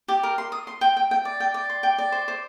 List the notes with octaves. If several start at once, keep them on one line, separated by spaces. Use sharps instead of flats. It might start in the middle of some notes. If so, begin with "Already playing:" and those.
G4
A#4
C6
D#6
C6
G5
G5
G5
D5
G5
D5
C6
G5
D5
C5
C5